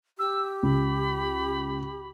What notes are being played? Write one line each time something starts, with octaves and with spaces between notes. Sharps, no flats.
G4 E6
C#2 B5